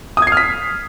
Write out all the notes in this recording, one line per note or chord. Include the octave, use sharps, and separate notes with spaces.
D#6 F6 G#6 B6 C7